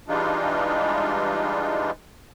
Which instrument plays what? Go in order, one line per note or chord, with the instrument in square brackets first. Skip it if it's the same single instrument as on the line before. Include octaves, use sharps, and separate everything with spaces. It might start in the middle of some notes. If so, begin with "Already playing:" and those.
[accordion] E3 G3 G#3 D4 D#4 F4